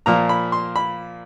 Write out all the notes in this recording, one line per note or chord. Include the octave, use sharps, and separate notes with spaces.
A#2 F3 A#3 A#5
B5
C6
B5